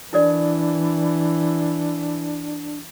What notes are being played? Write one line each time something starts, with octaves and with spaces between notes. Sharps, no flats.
E3 D4 E4 A#4 D5